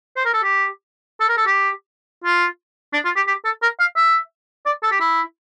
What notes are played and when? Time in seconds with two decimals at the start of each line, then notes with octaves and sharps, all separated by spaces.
0.17 C5
0.25 A#4
0.34 A4
0.43 G4
1.20 A4
1.29 A#4
1.37 A4
1.46 G4
2.24 F4
2.93 D4
3.05 F4
3.16 G4
3.28 G4
3.45 A4
3.62 A#4
3.80 F5
3.97 E5
4.66 D5
4.83 A4
4.92 G4
5.00 E4